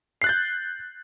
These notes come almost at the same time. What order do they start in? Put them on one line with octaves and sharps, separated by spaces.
C7 F#6 A6 G6